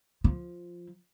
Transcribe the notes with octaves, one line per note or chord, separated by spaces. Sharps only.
F3